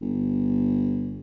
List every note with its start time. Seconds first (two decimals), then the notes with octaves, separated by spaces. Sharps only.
0.01 G1